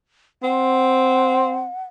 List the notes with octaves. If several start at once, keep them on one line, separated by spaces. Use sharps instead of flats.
C4 F#5